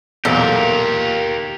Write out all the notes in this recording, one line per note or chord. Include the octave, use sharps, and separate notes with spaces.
B1 E2 A#2 G4 A4 A#4